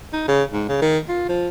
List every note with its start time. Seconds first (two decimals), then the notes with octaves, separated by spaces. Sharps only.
0.13 D#4
0.28 C#3
0.53 G#2
0.69 C#3
0.82 D#3
1.09 F4
1.29 F3